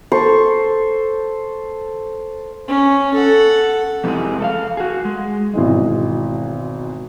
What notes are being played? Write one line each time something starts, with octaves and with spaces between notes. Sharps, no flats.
A4 C5 C#6
C#4
A4 F#5
F2 C3 E3 F3 G#3 G#4
A4 E5 F5
F#4 G#4
G#3
G#1 B2 E3 G#3